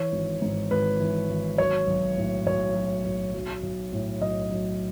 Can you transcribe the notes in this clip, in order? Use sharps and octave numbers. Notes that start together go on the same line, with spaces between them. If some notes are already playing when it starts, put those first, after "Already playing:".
Already playing: E3 C#5
G#1
G#2
G#1 B4
E3
G#1
F#3 C#5
B1
A2
B1 C#5
F#3
B1
F#3
B1
A2
B1 D#5
F#3